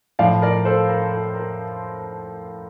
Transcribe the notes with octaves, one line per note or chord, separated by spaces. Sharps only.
A2 F3 D5 F5
A#4 D5
A4 C5
A#4
A4
A#4